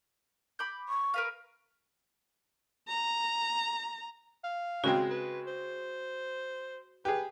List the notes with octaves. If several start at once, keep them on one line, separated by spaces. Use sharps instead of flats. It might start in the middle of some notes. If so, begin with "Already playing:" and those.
B5 D6 G6
C#6
A#4 B4 F5
A#5
F5
C#3 G#3 C4 F#4
B4
C5
G4 G#4 B4